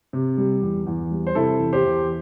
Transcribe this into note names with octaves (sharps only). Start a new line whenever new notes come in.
C3
G3
E2
E2
G3
C5
C3 E4 A4
E2
G4 C5
E2